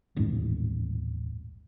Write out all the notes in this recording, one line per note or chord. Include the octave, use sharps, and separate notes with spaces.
D#1 A1 G#2